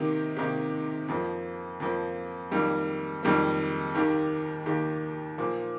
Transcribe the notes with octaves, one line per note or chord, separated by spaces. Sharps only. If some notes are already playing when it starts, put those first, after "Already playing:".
Already playing: C3 D#3 A#3 D#4 G4
C3 D#3 A#3 D#4 G4
F2 F3 A#3
F2 F3 A#3
F2 D#3 G3 A#3
F2 D#3 G3 A#3
D#2 D#3 A#3 G4
D#2 D#3 A#3 G4
A#2 F3 A#3